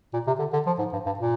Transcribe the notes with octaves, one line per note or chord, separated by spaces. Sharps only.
A#2
C3
D3
D3
F3
G#2
G2
G2
A#2